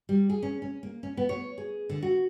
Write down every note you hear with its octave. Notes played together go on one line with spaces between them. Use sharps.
G3
G#4
C#4
C#4
A#3
C#4
B3
C#5
G#4
D3
F#4